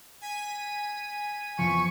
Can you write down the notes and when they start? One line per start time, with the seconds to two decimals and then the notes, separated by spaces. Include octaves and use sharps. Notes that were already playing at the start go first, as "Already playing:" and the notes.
0.21 G#5 B6 D#7
1.59 E2 A#2 F3 C#6